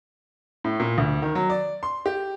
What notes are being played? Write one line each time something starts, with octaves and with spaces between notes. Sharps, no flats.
A2
A#2
D2
D#3
F#3
D5
C6
G4